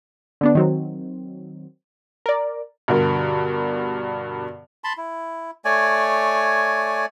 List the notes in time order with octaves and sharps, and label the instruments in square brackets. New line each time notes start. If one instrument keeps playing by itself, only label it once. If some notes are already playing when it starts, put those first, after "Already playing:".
[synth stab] D3 B3 D4
D#3 F#3 C4
A#4 D5
[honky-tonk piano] G2 B2 D3 A#4
[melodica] A5 B5 C6
E4
A3 C#5 D5 G#5